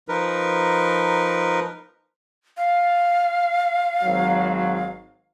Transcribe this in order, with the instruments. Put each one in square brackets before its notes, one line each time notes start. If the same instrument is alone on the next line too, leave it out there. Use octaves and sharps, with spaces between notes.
[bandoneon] F3 D#4 A#4 B4
[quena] F5
[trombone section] G#1 F#3